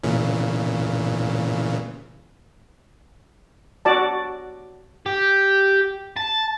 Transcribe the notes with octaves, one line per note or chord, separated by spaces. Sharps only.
A#2 C#3 E3
F#4 D5 A5
G4
A5